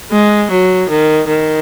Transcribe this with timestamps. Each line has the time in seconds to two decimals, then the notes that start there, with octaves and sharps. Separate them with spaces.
0.11 G#3
0.51 F#3
0.89 D#3
1.27 D#3